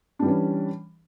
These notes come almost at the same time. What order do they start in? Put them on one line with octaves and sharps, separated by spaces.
D4 G3 E3 C#4